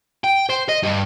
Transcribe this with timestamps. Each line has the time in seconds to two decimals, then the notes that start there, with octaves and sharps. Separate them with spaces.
0.24 G5
0.50 C5
0.69 D#5
0.83 G2